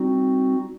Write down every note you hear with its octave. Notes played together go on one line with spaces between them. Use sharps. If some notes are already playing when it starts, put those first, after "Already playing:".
Already playing: G3 C4 D#4 F#4